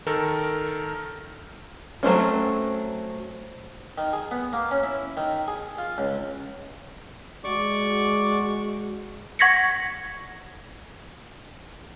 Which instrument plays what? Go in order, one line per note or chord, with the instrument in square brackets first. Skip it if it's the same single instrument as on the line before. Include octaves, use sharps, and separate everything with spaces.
[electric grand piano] D#3 A4 A#4
[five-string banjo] F#3 A3 C4 C#4
[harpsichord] D#3
G#4
B3
A#3
C#4
E4
D#3
G#4
F4
C#2
[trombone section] G#3 F#4 [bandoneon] D5 C#6 D6
[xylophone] F#5 C#6 G#6 A#6 B6 C#7